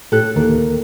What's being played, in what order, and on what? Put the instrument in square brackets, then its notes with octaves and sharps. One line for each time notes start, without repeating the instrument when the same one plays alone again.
[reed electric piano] A2 G4 F#6 [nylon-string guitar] A4
[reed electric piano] D2 D#3 A#4 [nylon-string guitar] A#3